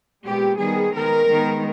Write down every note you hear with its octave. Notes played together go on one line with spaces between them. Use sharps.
A#2 G#3 B3 G4
D#3 G3 B3 G#4
D#3 G#3 B3 A#4
D#3 G#3 B3